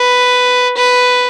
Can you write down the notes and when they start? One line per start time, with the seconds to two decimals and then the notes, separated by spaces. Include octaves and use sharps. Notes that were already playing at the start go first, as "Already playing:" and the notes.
Already playing: B4
0.77 B4